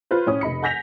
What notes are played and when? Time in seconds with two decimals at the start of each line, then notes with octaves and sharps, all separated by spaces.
0.11 F4 B4 C5
0.27 A2 C#4 D#6
0.41 F1 D#5 B5 C#7
0.62 F#5 G#5 G6 A#6 B6 F7